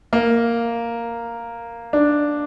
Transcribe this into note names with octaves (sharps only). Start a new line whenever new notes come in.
A#3
D4